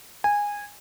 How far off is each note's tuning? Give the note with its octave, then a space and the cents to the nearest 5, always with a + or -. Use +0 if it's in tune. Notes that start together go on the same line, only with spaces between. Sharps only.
G#5 -15